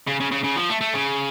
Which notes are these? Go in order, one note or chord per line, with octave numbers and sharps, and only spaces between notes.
C#3
C#3
C#3
C#3
F3
A3
A3
C#3